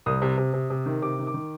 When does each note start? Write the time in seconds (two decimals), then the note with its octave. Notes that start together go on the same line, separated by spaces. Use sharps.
0.06 C2 D#6
0.22 C3
0.38 C3
0.53 C3
0.70 C3
0.86 D#3
1.02 C3 D6
1.19 D#3
1.27 D6
1.34 D#3